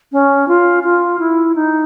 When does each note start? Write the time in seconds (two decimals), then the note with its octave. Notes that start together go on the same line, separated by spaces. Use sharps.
0.12 C#4
0.48 F4
0.83 F4
1.19 E4
1.55 D#4